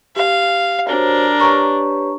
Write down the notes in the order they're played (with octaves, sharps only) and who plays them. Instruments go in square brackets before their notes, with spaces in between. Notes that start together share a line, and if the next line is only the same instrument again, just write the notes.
[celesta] G4 [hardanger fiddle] F5
[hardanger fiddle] D4 [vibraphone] F#4 C5 C#5 [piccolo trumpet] A#4
[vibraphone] G4 B4 C#5 [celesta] A#5 C#6